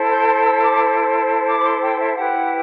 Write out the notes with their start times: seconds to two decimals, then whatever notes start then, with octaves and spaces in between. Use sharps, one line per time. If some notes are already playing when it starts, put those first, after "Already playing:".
Already playing: E4 A4 C5
0.11 G6
0.27 G6
0.45 E6
0.61 D6
1.47 D6
1.59 B5
1.65 C6
1.82 G5
1.99 E5
2.16 E4 G4 B4 F#5